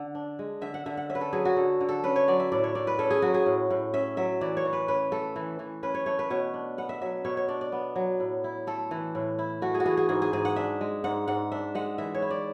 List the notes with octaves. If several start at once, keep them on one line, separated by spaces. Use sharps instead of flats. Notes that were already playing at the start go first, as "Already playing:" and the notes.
Already playing: D3 F#5
D4
G#3
D3 E5
F#5
D3 E5
F#5
C#4 E5
B4
A4
F#3 G#4
F#4
D3 A4
D3
A4
C#4 B4
C#5
F#3 D5
E5
A2 D5
C#5
A2 D5
B4
C#4 A4
G#4
F#3 F#4
G#4
A2
A2
C#4 E5
F#3 E5
E3 D5
C#5
E3
B4
C#4 B4
A3 A4
E3
E3
C#4 B4
C#5
A3 C#5
B4
B2 C#5
D4
B3 F#5
E5
F#3 E5
B2 C#5
C#5
D4 D5
D5
B3
F#3
A2
E4
A3 A4
E3
A2
E4
A3 F#4
G#4
F#4
E3 G#4
G#4
G#2 G#4
G#4
G#2 G#4
F#5
D4 E5
G#3
G#2 F#5
G#2 F#5
D4 E5
G#3 F#5
E3 E5
C#5
E4
D5